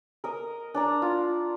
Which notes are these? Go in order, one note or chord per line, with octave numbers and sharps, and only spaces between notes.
A#4 D#5
D4 D5 A#5
F4